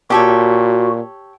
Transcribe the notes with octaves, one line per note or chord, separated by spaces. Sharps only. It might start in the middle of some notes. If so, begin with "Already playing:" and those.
A#2 F#4 G4 A4 C#5